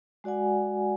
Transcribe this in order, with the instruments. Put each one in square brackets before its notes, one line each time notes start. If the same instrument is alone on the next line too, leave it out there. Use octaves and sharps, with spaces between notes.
[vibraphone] G#3 F#4 D5 F#5 G#5